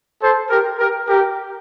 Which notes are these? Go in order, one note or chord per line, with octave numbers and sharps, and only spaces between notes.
A4 C5
G4 A#4
G4 A#4
G4 A#4